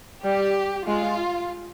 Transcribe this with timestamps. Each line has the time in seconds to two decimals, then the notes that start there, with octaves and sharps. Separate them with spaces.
0.24 G3 G4
0.87 G#3 F4